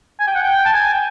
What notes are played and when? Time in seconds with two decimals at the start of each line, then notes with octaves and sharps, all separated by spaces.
0.19 G#5
0.27 G5
0.35 F#5
0.43 G5
0.65 A5
0.73 G#5
0.93 G5